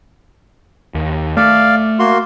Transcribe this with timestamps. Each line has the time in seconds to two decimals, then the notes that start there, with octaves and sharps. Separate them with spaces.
0.95 D#2
1.37 A3 D5 F5
1.99 A#3 F#4 C6